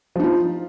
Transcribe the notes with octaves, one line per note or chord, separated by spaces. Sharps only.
F3 D#4 F4